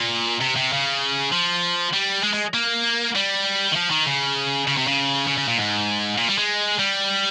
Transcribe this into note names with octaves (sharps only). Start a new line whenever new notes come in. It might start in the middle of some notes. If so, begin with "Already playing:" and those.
Already playing: A#2
C3
C3
C#3
F3
G3
G#3
G#3
A#3
G3
D#3
F3
D#3
C#3
C#3
C3
C#3
C#3
C#3
A#2
G#2
A#2
G3
G#3
G3